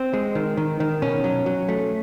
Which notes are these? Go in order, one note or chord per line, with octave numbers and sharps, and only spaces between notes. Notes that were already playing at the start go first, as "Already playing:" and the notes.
Already playing: C4
G#3
D#3
D#3
D#3
B2 C#4
F#3
F#3
A3